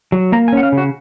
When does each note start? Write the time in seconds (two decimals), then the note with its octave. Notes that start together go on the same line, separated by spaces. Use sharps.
0.12 F#3
0.32 A#3 A#5
0.48 G#5
0.53 C#4 F#5
0.63 F5
0.72 C#3
0.78 F#4